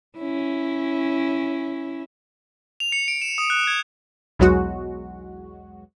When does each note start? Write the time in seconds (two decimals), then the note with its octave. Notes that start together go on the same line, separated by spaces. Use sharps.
0.18 C#4 E4
2.80 F7
2.92 C#7
3.08 D7
3.22 E7
3.38 D#6
3.50 F#6
3.67 G#6
4.39 B1 E2 F#3 G#3 F#4